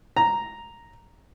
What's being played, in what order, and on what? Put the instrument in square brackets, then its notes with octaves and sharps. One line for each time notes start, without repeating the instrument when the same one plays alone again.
[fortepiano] A#5